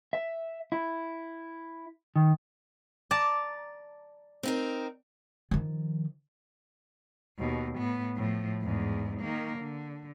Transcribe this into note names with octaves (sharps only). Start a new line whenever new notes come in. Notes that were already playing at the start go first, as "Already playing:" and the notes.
E5
E4
D#3
D5 A5 A#5
C4 D#4 A#4
D#3 F3
D#2 B2
A2 B3
A2 F3
E2 G#2
D#3 A#3
D3